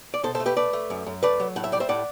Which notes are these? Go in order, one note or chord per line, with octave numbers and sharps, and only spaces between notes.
D5
B2 A4 C5
A4 C5
A3
G4 B4
A3 B4 D5
A3
F#2
F#2
A3 B4 D5
F#3
A2 F#5
E5
G3 D5
C5 E5
A2 D5 F#5